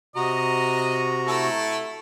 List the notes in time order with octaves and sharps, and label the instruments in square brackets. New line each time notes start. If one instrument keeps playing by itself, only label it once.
[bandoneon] C3 F#4 A#5 [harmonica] D#5
[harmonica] A3 E4 A4